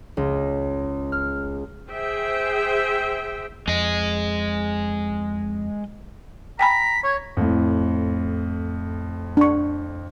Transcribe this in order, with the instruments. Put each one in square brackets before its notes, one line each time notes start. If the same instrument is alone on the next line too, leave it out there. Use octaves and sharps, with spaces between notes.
[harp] C#2
F6
[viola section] G#4 C5 E5 G5
[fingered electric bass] F2 [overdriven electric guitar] G#3 D#5
[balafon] G5 G#5 B5 [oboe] A#5 [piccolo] B6
[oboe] C#5 [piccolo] G#6
[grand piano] F2 A2
[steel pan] D4 C#6